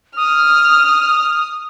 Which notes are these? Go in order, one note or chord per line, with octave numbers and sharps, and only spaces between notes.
D#6 F6